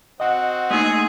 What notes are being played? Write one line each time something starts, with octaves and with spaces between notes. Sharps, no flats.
C4 F#4 D#5 F#5
A3 A#3 D#4 G#4